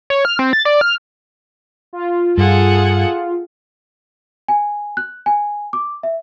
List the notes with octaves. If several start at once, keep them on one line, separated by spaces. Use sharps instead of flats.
C#5
F6
C4
A6
D5
F6
F4
G2 G#4 A4 F#5
G#5
F#6
G#5
D6
E5